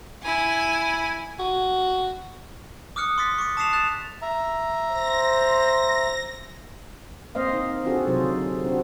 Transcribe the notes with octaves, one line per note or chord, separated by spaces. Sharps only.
E4 G#5
F#4
D6 D#6 F6 F#6 C#7
C6 D6 A6 B6
C#6 D6
A5 D6 D#6 C7 E7 F7
F#6 A6 E7 F7
E5 A#5
C5 A#6
A#3 C4 C5 D#5 F5
D#4
C4 D4 F4 F#4 G#4 A4
C3 F#3 D#4 C5
D3
C4 D4 F#4